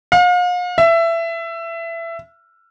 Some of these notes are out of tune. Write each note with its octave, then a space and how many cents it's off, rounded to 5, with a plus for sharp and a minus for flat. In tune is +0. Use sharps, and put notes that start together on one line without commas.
F5 +40
E5 +20